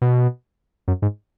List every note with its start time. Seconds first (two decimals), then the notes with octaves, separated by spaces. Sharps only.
0.02 B2
0.88 F#2
1.02 G#2